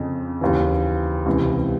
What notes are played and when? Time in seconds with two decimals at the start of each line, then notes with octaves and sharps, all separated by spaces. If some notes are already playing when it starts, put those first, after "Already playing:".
Already playing: F2 C#3 F3
0.41 D#2 C#3 E3
1.26 C#2 C3 E3